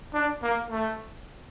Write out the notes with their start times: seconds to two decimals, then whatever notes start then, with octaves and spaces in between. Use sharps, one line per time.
0.14 D4
0.43 A#3
0.70 A3